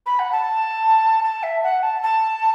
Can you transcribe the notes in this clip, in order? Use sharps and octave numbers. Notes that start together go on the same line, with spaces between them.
B5
F#5
A5
A5
E5
F#5
A5
A5